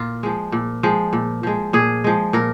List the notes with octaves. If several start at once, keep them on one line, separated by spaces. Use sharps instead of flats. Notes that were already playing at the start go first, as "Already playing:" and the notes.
Already playing: A#2 F4
F3 G#3
A#2
F3 G#3
A#2
F3 G#3
A#2 G#4
F3 G#3
A#2 A#4